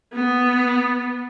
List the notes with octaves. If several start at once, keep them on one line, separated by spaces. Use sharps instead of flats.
B3